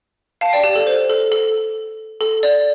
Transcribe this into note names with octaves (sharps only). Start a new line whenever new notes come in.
F5 A5
D5 G5
G4
A4
C5
A4
A4
A4
D5